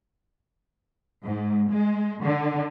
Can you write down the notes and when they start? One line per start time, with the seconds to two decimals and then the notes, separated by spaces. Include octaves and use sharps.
1.24 G#2
1.72 G#3
2.23 D3